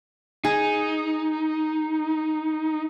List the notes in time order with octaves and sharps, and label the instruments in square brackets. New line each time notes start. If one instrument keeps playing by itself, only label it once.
[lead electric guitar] D#4 [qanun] G#4